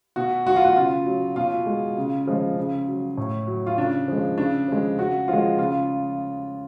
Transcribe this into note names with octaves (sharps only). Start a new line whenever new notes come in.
B2 F#4
F#3 F#4
F4
F#4
C#3 F4
F#3
B2 F4
G#3
C#3
F3 G#3
C#3
F#3
A2
F#3
F4
C#3 D4
F3 G#3
C#3 D4
F3 G#3
C#3 F#4
F3 G#3 F4
C#3 F4